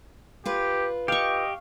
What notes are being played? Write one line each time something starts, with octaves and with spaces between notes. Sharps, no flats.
F4 G4 B4
G4 D#5 F5 C#6